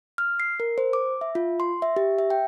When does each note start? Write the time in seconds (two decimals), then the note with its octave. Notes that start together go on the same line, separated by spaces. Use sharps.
0.18 F6
0.40 C7
0.60 A#4
0.78 C5
0.93 D6
1.21 E5
1.35 F4
1.60 C6
1.82 E5
1.96 G4
2.19 E5
2.30 G5